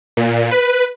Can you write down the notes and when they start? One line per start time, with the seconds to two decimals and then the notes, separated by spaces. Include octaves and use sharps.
0.17 A#2
0.51 B4